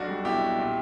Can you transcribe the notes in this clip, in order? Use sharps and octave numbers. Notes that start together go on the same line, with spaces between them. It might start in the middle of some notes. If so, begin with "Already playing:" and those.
Already playing: B1 D4 F#4
G3
B2 E4 G4
B2
A#2